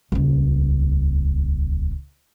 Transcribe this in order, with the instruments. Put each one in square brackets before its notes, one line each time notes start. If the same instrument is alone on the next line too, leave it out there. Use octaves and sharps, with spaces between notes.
[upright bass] D#1 C#2